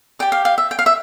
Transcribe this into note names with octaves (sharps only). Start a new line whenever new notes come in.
G4 D5 G5
F5
F5
E5
G5
F5
E5